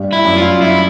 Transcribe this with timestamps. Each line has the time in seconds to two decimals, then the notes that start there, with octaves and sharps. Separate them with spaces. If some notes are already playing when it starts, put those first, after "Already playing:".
Already playing: G2
0.13 E4
0.25 F#2
0.37 F4
0.62 E4